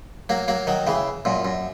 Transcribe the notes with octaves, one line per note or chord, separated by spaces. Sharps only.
F#3 A#3
F#3 A#3
D#3 F#3
C#3 E3
F#2 A#2
F#2